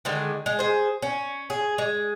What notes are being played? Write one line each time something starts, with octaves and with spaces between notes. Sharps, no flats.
D3 D#3 G#3
G#3
G#4 C5
C#4
G#4
G#3